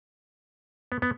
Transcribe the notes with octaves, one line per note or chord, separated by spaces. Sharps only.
B3
B3